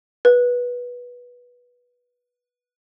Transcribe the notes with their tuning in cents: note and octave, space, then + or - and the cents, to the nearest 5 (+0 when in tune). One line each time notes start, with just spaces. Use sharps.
B4 -15